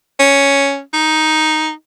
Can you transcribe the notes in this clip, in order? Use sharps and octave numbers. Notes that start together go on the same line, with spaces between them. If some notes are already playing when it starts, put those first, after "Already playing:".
C#4
D#4